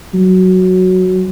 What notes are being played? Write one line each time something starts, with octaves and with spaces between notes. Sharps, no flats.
F#3